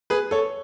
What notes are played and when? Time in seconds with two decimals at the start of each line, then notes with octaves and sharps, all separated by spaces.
0.10 G#4 B4
0.31 A4 C#5